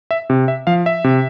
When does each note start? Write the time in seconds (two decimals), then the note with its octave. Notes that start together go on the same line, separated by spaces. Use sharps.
0.11 E5
0.30 C3
0.48 E5
0.67 F3 F5
0.86 E5
1.04 C3